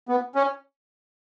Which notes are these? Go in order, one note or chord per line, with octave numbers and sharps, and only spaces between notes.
B3
C#4